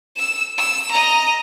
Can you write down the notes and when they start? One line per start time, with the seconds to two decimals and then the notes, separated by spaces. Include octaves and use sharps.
0.16 E6 E7
0.58 E6
0.91 D#5 A#5